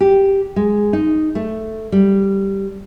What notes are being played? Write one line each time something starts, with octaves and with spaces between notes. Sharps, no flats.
G4
G#3
D#4
A3
G3